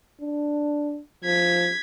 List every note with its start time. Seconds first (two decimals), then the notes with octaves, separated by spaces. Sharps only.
0.21 D4
1.24 F3 G#6 B6